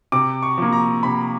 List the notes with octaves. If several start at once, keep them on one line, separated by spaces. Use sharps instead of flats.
C3 D6
C#6
F3 A#3
A#5
C3 B5